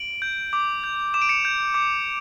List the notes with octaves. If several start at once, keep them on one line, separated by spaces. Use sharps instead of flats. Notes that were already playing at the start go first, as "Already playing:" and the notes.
Already playing: D7 F#7
G6
D6
G6
D6 E7
D7
C#7 E7
G6
D6